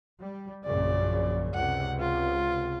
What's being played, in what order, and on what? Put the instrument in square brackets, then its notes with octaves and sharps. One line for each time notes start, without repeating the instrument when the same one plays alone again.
[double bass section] G3
[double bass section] A#1 F#2 C#3 [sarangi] D5
[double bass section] C#2 C3 [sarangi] F#5
[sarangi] F4